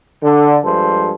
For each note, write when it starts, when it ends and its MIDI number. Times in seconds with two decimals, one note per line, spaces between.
0.23 0.57 50
0.64 1.13 43
0.64 1.13 53
0.64 1.13 56
0.64 1.13 69
0.64 1.13 72